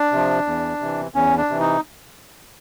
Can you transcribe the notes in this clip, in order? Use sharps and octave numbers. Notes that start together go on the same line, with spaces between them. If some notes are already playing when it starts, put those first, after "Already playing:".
Already playing: D4
C3 F3
E2
C3 E3
E2 C#4
D4
C3 E3
D#4